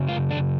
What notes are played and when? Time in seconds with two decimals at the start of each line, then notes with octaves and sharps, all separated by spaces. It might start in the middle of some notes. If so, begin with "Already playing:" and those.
Already playing: F#2 C#3
0.08 F4
0.31 D4